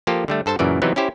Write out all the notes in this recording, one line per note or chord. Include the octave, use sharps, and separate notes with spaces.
F3 A#3 F4 G4 A4
D3 G3 A3
G2 A4 C5 A5
F#2 A#2 C#3 E3 D5
C3 E3 F#3 B3 C4 D#4
C#4 E4 G4 C5